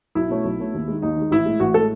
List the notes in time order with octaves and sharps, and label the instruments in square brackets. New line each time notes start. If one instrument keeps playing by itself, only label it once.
[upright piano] B1 E4
B2 A3 C#4
B1
B2 A3 C#4
D#2
D#3 G#3
D#2 D#4
D#3 G#3
A1 E4
A2 G#3
A1 F#4
A2 G#3 A4